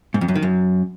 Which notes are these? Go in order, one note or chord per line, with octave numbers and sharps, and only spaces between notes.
G#2
F2
F#2
D#3
F#2